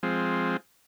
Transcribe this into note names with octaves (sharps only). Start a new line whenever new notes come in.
F3 G#3 C4